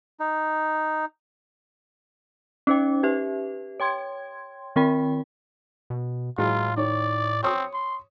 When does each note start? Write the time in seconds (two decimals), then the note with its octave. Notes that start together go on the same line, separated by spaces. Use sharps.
0.20 D#4
2.67 C#4 D#4 C5 G5
3.03 G4 B4 E5
3.80 C#5 G5 C6 G#6
4.76 D#3 C4 A#4 G5 B5
5.90 B2
6.38 A2 E3 F#3 G#3 F4
6.77 D#3 C#5 D5
7.43 C4 C#5 C#6 D#6
7.74 C6